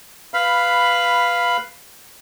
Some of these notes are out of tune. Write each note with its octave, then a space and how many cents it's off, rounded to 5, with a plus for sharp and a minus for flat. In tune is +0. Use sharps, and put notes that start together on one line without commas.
B4 +5 F5 +0 B5 +0